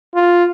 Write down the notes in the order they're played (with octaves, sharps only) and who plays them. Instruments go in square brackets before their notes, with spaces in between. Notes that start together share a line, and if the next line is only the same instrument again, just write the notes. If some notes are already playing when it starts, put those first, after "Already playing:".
[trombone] F4